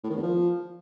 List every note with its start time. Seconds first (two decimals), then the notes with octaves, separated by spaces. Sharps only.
0.03 A2
0.10 D#3
0.16 E2
0.22 F3